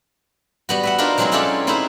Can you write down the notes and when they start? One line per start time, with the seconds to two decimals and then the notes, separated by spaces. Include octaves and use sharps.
0.69 G3 B3 F#4
0.83 B4 E5 F#5
0.98 D4 D#4 F4 F#4 A#4 C5
1.18 B2 F#3 G#3 C4 D#4 E4
1.32 C#4 E4 F4 G4 A4 D5
1.67 C4 D#4 E4 G#4 B4 C5